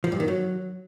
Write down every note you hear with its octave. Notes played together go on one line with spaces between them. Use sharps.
F3
G2
D#3
F#3